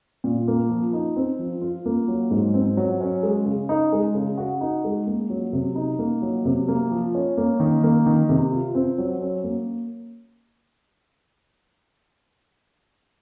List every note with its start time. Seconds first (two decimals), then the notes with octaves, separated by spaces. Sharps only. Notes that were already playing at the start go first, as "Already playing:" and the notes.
0.24 A#2
0.48 A#3
0.70 F3
0.93 D#4
1.16 C4
1.39 F3
1.62 F4
1.86 A#3
2.08 F#3
2.31 G#2
2.54 C4
2.77 F#3
3.01 C#4
3.23 G#3
3.46 C#3
3.69 D#4
3.92 G#3
4.14 C#3
4.38 F#4
4.61 D#4
4.84 G#3
5.07 A#3
5.30 F#3
5.53 C3
5.76 D#4
5.99 A#3
6.22 F#3
6.45 C3
6.68 A#3
6.91 F3
7.15 C#4
7.37 A#3
7.60 D#3
7.83 A#3
8.06 D#3
8.29 C3
8.52 F4
8.75 C4
8.98 F#3
9.21 C#4
9.44 A#3